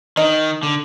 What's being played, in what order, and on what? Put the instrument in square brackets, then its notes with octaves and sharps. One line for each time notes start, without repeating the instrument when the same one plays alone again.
[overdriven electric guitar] D#3 [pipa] D#4
[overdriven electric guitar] D3